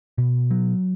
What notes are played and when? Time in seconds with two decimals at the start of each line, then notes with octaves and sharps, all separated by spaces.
0.18 B2
0.51 F#3